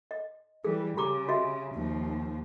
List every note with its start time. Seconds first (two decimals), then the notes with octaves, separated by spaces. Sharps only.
0.11 D#5
0.65 E3 G3 G#4
0.97 C#3 G4 A#5 D6
1.28 F#4 D#5 E5
1.74 D#2 F3